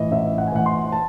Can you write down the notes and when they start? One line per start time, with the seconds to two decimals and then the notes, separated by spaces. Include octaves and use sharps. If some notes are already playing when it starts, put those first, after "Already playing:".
Already playing: A1 A2 E3 D#5
0.11 A1 E5
0.38 F#5
0.47 G#5
0.52 A2 E3 F#5
0.66 C6
0.92 A5